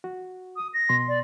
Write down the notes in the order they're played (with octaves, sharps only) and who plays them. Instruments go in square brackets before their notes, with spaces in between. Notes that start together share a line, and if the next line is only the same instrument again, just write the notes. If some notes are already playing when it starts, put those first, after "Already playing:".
[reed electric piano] F#4
[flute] D#6
A#6
[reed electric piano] B2 C6
[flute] D5